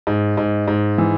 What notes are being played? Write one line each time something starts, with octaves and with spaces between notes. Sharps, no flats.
G#2
G#2
G#2
E3